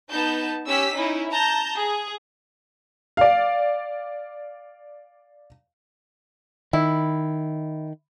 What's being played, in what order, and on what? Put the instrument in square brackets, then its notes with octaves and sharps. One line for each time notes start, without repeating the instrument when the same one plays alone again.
[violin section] B3 D#4 A5 G6
C#4 G4 E6 B6
C#4 D#4 E4
A5 A#5 G6
G#4
[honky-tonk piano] D5 F5
[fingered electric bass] D#3 [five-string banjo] E4